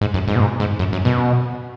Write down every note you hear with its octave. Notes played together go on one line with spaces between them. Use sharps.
G#2
F#2
G#2
B2
G#2
G#2
F#2
F#2
B2